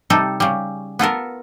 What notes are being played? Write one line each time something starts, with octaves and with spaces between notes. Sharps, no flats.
C3 G3 D#4 A4
C#3 G3
B3 F4 A4 A#4